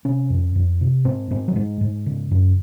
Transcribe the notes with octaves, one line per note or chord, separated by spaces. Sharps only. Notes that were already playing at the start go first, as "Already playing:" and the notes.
C3 C#4
F2
F2
C3
G#2 C4
G#2 C4
F#3
G#2 G#3
G#2
C#3
F#2